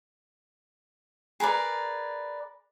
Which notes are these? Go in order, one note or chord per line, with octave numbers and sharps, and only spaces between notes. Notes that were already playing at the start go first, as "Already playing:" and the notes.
G#4 A#4 B4 D5